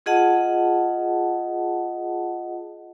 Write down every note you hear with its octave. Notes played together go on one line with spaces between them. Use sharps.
F4 G#4 D#5 F#5 A5